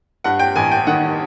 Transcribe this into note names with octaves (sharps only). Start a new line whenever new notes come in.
G2 F#5
G5
A1 G#5
G5
D#3 F#5